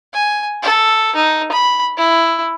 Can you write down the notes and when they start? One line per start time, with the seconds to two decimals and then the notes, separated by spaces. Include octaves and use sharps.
0.14 G#5
0.62 A4
1.16 D#4
1.52 B5
1.97 E4